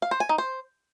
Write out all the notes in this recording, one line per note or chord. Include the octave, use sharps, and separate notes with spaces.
F5
C5
G#5
D#4
C5